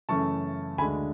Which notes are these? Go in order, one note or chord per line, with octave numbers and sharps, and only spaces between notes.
F#2 C#3 E3 A3 C#4 A5 C#6
D2 D3 G#3 D4 G#5 B5